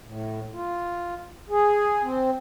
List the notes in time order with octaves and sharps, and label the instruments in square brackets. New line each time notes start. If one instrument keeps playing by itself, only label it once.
[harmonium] A2
F4
G#4
C4